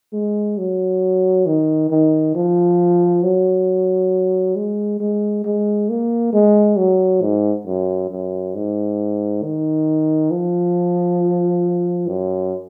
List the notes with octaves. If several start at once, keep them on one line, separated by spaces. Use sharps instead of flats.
G#3
F#3
D#3
D#3
F3
F#3
G#3
G#3
G#3
A#3
G#3
F#3
G#2
F#2
F#2
G#2
D#3
F3
F#2